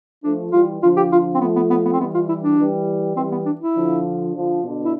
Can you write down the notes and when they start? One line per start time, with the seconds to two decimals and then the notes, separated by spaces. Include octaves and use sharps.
0.24 F3 A3 D4
0.52 E3 G3 F4
0.81 D3 F3 F4
0.97 G4
1.12 F4
1.34 C4
1.41 F3 A3 B3
1.56 B3
1.70 B3
1.85 B3
1.92 C4
1.99 E3 G3 B3
2.14 F4
2.29 E4
2.43 D4
2.58 E3 G3
3.16 E3 G3 C4
3.32 B3
3.46 D4
3.61 E4
3.75 D3 F3
4.34 D3 F3
4.63 B2 D3
4.85 E4